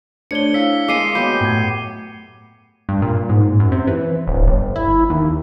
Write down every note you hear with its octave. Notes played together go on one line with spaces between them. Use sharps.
A3 D4 C5 C#5 G#6 C#7 G7
E4 F5 E6 B6
G#3 A#3 D#5 D6 C7 D#7
F#3 B3 G4 B5 G6
A2 G#6
G2
A#2
G#2
F#2
C3
E3
D1
G1
E4
D#2